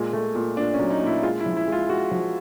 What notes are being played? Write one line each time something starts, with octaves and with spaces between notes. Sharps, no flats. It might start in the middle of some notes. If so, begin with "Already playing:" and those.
Already playing: A#2 G#3
A3
A#2
A#2 D4
C#4
F#3
D#4
A#2 E4
G#3 F4
E4
F3
E4
G#3
F4
G#3 F#4
F3